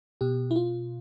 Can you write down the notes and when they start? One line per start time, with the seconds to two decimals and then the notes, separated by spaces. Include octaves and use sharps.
0.21 B2 G4
0.51 E4
0.56 F4